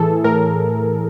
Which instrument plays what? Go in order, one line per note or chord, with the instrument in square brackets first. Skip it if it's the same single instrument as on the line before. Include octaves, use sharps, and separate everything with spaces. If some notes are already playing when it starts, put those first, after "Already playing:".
Already playing: [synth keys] A2 E3 G#4 A4
A2 A#4